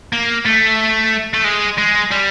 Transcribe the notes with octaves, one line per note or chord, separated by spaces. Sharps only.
A#3
A3
A3
G#3
G#3
G3